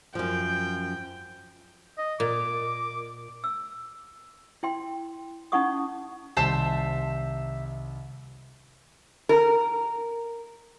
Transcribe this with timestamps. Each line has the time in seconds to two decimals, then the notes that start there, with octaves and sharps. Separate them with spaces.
0.15 F#2 F3 G5
1.98 D#5
2.20 A#2 D6
3.44 E6
4.63 E4 G5 C6
5.52 C#4 D#4 E4 F#5 C#6 D#6
6.37 C2 D#3 C5 E5 A5
9.29 A#4